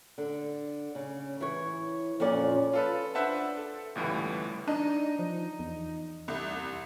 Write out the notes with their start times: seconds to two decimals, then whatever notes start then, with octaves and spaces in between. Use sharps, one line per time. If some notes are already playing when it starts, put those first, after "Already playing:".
0.18 D3
0.95 C#3
1.40 E3 C#5
2.20 F2 A#2 C#4 D5
2.73 F4 A4 B4
3.15 D4 B4 C5 E5 F#5 A5
3.57 A4
3.95 G1 C#2 A2 E3 G3
4.68 D4 D#4
5.19 F3
5.59 E2
6.28 C2